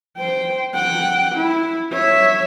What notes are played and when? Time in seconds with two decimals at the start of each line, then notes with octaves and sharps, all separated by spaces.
0.17 C5 G5
0.75 F#5 G5
1.35 E4
1.93 C#5 E5